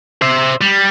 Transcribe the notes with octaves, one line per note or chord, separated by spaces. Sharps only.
C5 E5
G3